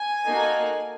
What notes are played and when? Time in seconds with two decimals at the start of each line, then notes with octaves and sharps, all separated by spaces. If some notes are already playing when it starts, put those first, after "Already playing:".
Already playing: G#5
0.27 A#3 D#4 F#4 A4